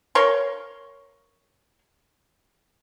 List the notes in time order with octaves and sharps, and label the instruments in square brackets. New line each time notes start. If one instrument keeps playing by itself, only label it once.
[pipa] A#4 C#5 F5 C6